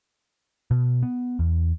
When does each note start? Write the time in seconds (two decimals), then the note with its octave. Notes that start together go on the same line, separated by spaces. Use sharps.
0.71 B2
1.03 B3
1.39 E2